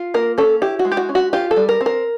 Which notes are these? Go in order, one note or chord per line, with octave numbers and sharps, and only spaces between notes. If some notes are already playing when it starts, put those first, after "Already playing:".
Already playing: F4
A#3 A#4
C#4 A4
E4 G4
F#4
G#3
G4
F#4
C#4
F#4
F4 G4
A4
G3
A#4
C4
A#4